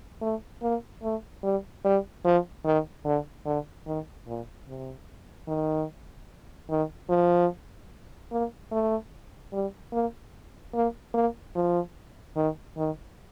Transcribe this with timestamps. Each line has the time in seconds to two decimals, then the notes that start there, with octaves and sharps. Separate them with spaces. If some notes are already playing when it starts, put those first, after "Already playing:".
0.21 A3
0.63 A#3
1.03 A3
1.43 G3
1.84 G3
2.25 F3
2.65 D#3
3.05 D3
3.46 D3
3.86 D#3
4.27 A#2
4.68 C3
5.47 D#3
6.70 D#3
7.09 F3
8.32 A#3
8.72 A3
9.53 G3
9.92 A#3
10.74 A#3
11.14 A#3
11.55 F3
12.36 D#3
12.77 D#3